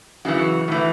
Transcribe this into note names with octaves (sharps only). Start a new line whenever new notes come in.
F#2 C#3 E3 F#4
A2 E3